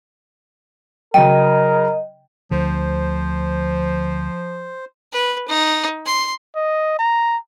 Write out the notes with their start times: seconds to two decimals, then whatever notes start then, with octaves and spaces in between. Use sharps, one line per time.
1.14 C#3 F#3 A#4 D#5 G5
2.51 D2 D3 F3 C5
5.12 B4
5.48 D#4
6.05 C6
6.55 D#5
6.99 A#5